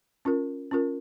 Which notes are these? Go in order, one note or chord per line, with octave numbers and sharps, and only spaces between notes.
C#4 F4 A#4
C#4 F4 A#4